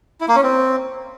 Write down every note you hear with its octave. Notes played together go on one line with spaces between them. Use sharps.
E4
A#3
C#4
C4